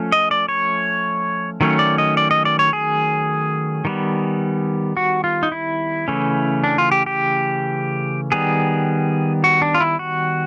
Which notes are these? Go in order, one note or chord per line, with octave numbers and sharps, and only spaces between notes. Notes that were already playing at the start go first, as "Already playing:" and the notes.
Already playing: F3 A3 C#4
D#5
D5
C#5
D#3 F#3 A3 C#4
D5
D#5
D5
D#5
D5
C#5
G#4
D#3 G3 B3
F#4
F4
D#4
E4
C#3 E3 A3 C#4
D4
F4
G4
G4
D#3 G3 B3 G#4
F#4
D4
F4
E4
F#4